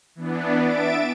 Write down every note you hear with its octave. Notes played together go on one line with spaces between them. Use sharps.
E3 B3 D4
E5 A6 D7